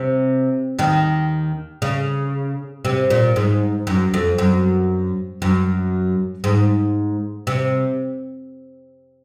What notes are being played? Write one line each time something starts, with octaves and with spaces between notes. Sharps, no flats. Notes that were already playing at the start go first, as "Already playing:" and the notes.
Already playing: C3
D#2 D#3
C#3
C3
A#2
G#2
F#2
F2
F#2
F#2
G#2
C3